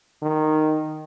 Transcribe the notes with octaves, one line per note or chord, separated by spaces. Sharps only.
D#3